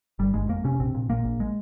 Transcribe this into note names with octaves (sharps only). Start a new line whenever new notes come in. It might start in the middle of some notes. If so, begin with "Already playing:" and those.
G1 G3
G1 G#3
F2 A#3
C3 C#4
A#1 C4
A#2
A#2 A#3
A#1
G#3